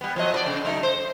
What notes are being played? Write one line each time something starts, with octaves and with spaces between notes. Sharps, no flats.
G3 B3
F3 F#3 D#5
B2 B4 D5
C#3
F#3 A3 D#4
C5